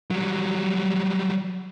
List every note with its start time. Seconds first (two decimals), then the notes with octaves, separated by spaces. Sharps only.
0.11 F#3 G3